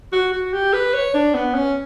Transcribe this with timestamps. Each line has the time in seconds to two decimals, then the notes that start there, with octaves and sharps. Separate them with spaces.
0.12 F#4
0.33 F#4
0.53 G4
0.73 B4
0.94 C#5
1.14 D4
1.34 B3
1.54 C#4